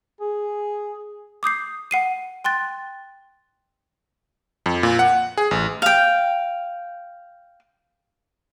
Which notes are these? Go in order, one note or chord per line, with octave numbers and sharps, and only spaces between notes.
G#4
D6 D#6 G6 C7
F#5 C7 D#7
G5 C6 F#6 A6
F2
A#2
F#5
G#4
A1
F5 G5